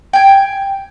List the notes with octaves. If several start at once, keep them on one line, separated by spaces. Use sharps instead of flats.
G5 G#5